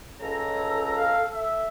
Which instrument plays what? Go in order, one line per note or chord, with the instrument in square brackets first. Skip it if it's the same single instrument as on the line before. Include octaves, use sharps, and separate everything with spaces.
[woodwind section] C#2 C#3 A#5 [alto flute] A4
[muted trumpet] F5
E5